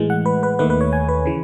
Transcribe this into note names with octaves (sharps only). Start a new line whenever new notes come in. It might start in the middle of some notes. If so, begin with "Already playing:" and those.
Already playing: A2 E3 G#3
F#5
B4
B4
D#2 D#3 A3 B4
B4
C#5
G#5
B4
C#3 E3